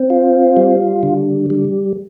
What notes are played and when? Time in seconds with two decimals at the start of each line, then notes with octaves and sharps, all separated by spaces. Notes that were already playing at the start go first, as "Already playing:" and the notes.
Already playing: C4
0.10 F4
0.57 G3
1.03 D3
1.50 G3